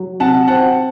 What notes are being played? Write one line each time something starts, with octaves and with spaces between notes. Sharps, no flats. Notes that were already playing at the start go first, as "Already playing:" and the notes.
Already playing: F#3
C3 F#5 A5
C4 F#5 A5